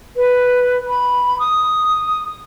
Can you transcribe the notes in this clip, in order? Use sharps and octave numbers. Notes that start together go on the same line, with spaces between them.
B4
B5
D#6